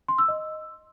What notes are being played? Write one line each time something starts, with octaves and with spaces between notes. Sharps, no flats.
C6
E6
D#5